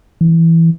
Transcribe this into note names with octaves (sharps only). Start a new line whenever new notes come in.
E3